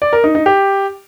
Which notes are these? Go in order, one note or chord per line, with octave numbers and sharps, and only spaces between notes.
D5
A#4
D#4
D#4
G4